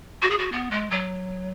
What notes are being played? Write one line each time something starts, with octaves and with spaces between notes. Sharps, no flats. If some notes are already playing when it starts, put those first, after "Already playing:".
F#4
G#4
F#4
B3
G#3
F#3